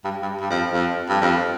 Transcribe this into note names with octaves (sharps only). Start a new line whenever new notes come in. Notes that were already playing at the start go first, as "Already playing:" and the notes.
G2
G2
G2
F2
F2
G2
F2